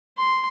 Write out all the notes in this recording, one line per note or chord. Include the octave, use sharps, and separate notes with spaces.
C6